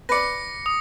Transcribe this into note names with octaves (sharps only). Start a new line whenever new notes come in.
B4 D5 A#6 C#7
D#6